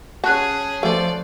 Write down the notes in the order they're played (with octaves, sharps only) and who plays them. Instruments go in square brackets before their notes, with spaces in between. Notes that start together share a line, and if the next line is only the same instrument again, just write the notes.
[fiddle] C#4 G#4 [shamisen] F#4 [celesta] A5 F#6
[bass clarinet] F3 [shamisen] A3 C5 [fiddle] D5